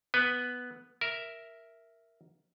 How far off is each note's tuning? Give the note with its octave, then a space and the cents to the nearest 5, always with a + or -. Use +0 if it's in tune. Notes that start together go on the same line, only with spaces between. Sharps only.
B3 +0 B4 +0
A#4 +0 E5 +0